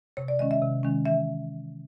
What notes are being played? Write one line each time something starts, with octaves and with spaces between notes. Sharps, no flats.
C3 C#5
D5
D#3 G#3 C#4 D#5
E5
C3
D#3 G#3 C#4
E3 E5